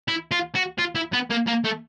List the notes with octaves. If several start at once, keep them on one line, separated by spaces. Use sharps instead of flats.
E4
F4
F#4
F4
E4
B3
A#3
A#3
A3